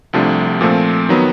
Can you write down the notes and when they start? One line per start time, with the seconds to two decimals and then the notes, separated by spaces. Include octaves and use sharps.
0.13 C2 C3 F3 A3 D4
0.61 A#2 F3 A3 C4
1.09 D#3 F#3 B3